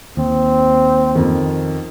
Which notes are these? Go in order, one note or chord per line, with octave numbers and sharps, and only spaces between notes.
D#2 C4
F2 D#3